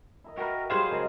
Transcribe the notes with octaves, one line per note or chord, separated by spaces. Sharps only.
E4 A#4 D#5
F#4 A#4 B4 G5 A5
F#3 G3 F4 G#4 C5 F5 C6
C#3 G#3 A#4